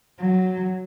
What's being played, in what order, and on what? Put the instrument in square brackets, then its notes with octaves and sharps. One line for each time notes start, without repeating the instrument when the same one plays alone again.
[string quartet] F#3